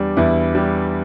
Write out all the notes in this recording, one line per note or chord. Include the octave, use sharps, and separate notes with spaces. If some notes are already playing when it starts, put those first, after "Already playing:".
Already playing: E2 G3 D4
E2 E4
G3